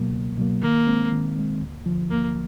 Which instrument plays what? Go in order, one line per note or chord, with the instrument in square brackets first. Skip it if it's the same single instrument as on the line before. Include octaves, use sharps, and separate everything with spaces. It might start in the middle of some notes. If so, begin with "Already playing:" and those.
Already playing: [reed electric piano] C#2 B2 F#3 A#3
C#2
B2 F#3 A#3
[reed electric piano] D#3 [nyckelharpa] A#3
[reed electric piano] G#3 C4
D#3
G#3 C4
D2
D3 F3
[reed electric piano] D2 [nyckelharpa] A#3